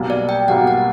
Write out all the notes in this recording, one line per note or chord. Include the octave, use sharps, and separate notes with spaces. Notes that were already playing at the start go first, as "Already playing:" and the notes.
Already playing: B1 B2 G3 A#3
D5
G5
B1 B2 G3 A#3 F#5
F#5